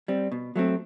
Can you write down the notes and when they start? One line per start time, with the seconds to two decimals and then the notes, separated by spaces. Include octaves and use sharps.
0.08 G3 C4
0.32 B2
0.56 F#3 A3 C4